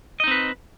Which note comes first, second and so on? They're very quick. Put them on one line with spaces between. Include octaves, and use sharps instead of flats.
D#5 D#4 C4 B4